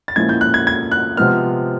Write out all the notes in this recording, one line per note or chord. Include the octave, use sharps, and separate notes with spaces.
A6
A#2 F3 G#3 C#4 E4 G#6
G6
F#6
G#6
G#6
F#6
C3 F3 G#3 B3 F6